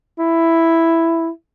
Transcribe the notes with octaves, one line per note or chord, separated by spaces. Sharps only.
E4